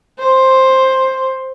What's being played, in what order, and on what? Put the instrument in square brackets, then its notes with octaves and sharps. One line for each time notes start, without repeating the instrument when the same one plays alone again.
[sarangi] C5